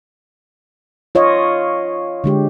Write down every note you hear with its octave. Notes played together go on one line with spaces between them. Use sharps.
F4 C#5 D#5 F5
D3 G#3 G4